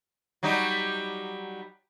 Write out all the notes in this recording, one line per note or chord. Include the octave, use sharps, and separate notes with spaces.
F#3 G3 D#4